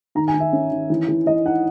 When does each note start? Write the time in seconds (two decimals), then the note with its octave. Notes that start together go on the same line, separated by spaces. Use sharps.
0.15 D#3 A#5
0.28 G#5
0.34 D#3
0.40 E5
0.53 C#4
0.71 D#3
0.90 E3
1.09 E3
1.26 E3 D#5
1.45 D#4 F#5